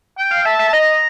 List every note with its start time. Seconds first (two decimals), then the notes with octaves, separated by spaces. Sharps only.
0.18 G5
0.31 F5
0.45 E5 A5
0.59 E5
0.68 A5
0.73 D#5 A#5